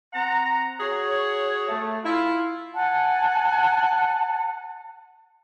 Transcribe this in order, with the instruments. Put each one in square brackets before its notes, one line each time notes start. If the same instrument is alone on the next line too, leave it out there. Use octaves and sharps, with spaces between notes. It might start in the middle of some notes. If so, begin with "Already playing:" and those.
[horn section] C4 F#5 A#5
F#4 G#4 C#5
A3
E4 F4
[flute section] F#5 G#5 A5